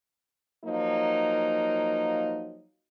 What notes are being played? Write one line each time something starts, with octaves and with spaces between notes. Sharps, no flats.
F3 F#3 A#3 D#4